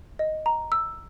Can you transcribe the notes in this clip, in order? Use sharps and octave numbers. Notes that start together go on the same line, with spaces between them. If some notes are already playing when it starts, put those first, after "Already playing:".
D#5
A#5
E6